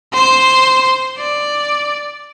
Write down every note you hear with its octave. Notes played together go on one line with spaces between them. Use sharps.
C5
D5